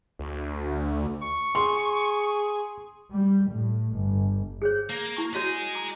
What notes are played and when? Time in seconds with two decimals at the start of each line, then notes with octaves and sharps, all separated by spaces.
0.19 D2
1.22 C#6
1.55 G#4 C6
3.11 G3
3.51 A2
3.94 G1
4.62 G#4 C5 C#5
4.90 A#3
5.17 E4 C#6
5.35 F#4 C#5 D#5 G#5
5.75 A#5 D6